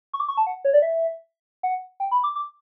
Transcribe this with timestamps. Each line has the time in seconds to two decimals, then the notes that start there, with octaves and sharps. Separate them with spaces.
0.13 C#6
0.20 D6
0.28 C#6
0.37 A5
0.47 F#5
0.65 C#5
0.73 D5
0.82 E5
1.63 F#5
2.00 G5
2.11 B5
2.24 D6
2.36 D6